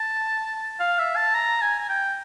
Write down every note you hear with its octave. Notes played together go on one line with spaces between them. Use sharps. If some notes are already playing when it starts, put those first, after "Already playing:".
Already playing: A5
F5
E5
A5
A#5
G#5
G#5
G5